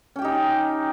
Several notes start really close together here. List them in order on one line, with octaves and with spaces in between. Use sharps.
C#4 G5 G4 D#4